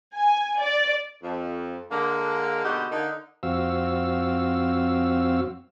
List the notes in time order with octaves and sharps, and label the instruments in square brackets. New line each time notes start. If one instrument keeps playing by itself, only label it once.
[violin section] G#5
D5
[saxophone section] F2
D3 G#3 A#3
B2 D3 G#3 D#4 F#4 G4
D3 A#3 D#4
[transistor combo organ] F2 C4 F#4 F5 E6